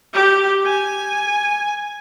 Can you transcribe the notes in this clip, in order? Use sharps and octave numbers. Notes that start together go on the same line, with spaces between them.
G4
G#5